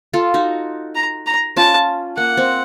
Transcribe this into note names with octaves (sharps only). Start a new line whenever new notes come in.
F4 A4
D#4 F#4
A#5
A#5
C#4 F4 A5
A#3 F#5
C4